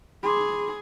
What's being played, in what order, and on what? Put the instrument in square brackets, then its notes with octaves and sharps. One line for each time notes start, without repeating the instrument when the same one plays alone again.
[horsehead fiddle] G#4 [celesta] B5 C6 D6